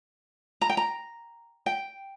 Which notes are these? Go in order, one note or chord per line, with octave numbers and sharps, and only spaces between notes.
A#5
G5
A#5
G5